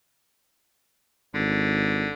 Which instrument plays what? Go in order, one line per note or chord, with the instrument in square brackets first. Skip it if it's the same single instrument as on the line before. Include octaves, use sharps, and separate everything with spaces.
[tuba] G#1 [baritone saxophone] D3